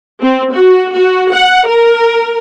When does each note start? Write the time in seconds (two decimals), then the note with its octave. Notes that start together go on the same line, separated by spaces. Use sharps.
0.22 C4
0.54 F#4
0.93 F#4
1.32 F#5
1.66 A#4